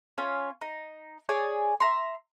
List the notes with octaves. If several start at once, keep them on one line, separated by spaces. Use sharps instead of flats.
C#4 F4 C#5
D#4
G#4 C#5 D5 G#5
E5 A#5 C6